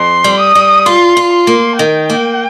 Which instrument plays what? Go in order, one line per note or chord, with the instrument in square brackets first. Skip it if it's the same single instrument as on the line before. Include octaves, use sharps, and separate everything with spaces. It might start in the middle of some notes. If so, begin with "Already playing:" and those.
Already playing: [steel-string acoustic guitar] F2 [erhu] C6
[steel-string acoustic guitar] G3
[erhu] D#6
[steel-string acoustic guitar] G3
[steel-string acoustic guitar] F4 [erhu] C6
[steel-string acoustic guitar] F4
[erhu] C6
[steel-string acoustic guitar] A#3
[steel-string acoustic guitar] D#3 [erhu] G5
[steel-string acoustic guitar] A#3